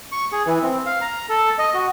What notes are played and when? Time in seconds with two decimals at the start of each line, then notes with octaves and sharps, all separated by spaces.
0.12 C#6
0.32 G#4
0.46 E3
0.63 C4
0.86 F5
1.01 A#5
1.29 A4
1.59 D#5
1.74 F#4